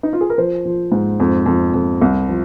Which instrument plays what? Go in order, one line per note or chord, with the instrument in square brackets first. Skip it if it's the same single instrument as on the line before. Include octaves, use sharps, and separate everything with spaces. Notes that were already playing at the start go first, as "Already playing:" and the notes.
[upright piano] D#4
F4
G#4
A#4
F3 C5
F3
G#2
F2
F2
F2
C2
F3